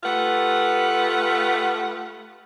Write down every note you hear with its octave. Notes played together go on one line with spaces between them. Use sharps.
A3 F4 G4 B4 F#5